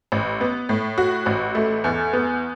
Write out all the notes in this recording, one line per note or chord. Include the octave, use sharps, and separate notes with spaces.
A1
B3
A2
F#4
A1
A3
E2
B3